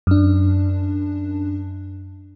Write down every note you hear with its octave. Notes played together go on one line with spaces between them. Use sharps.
F#2 D4